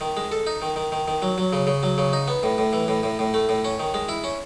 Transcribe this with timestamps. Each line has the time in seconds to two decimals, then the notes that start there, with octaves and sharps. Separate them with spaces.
0.01 D#3
0.17 G#3
0.32 A4
0.47 D#4
0.62 D#3
0.76 D#3
0.92 D#3
1.08 D#3
1.22 F#3
1.38 F#3
1.53 C#3
1.67 C#3
1.83 F#3
1.98 C#3
2.13 D#4
2.28 B3
2.43 A2
2.58 A2
2.73 E3
2.88 A2
3.03 A2
3.19 A2
3.34 A3
3.49 A2
3.65 C#4
3.80 D#3
3.94 G#3
4.09 E4
4.24 C#4